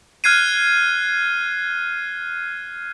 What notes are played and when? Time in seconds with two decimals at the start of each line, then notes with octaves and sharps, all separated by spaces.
0.24 F6 F#6 G#6 C7 D#7